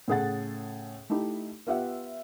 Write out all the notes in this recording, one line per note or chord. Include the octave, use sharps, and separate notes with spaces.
A2 C#3 G#4 A4 F#5 A6
A3 D#4 E4 G4
B3 F4 G4 E5 F#5